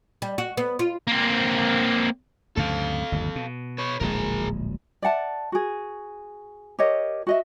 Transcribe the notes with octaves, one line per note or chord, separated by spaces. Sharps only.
G3
F#4
B3
F4
A#3 C4
D2 G2 C#3 A4 F5
G1 D#2
B2
B4 C#5
D1 A#1 G#3 G#4 A#4
D5 E5 F#5 A5
F#4 G#4
G4 A#4 C#5 D#5
F#4 D#5 E5